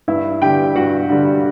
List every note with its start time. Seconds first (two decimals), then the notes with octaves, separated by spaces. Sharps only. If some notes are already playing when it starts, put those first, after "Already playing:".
0.08 G2 E4 E5
0.42 D3 G3 G4 G5
0.75 G2 F#4 F#5
1.10 D3 G3